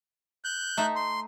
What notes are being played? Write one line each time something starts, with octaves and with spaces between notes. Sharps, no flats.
F#6 G6
A3 D#4 E5
C6